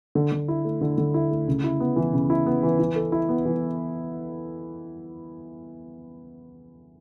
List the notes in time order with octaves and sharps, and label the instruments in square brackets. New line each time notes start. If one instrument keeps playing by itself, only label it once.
[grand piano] D3
D3
E4
A3
D3
D3
E4
A3
C#3
E4
B3
E3
C#3
E4
B3
E3
E3
A4
E4
B3
E3